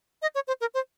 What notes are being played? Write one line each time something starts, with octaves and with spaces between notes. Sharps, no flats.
D#5
C#5
C5
A#4
C5